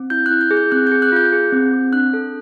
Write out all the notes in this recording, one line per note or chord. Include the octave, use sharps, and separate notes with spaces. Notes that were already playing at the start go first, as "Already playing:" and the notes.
Already playing: C4
E4 G6
E4 F#6
G6
G#4
G6
C4 F#6
G#4 G6
F#6
F4 G6
G#4
C4
C4
D4 F#6
A4